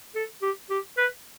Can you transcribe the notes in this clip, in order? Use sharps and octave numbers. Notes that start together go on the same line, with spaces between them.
A4
G4
G4
B4